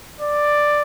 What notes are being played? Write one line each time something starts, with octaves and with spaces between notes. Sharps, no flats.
D5